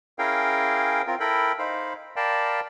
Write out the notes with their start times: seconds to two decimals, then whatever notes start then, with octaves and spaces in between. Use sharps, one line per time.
0.19 C#4 E4 G#4 A#4 F5 G5
1.07 C4 F4 A#4
1.20 E4 A4 A#4 G5 B5
1.59 D#4 C5 F5 B5
2.16 A#4 D5 F5 G5 A5 B5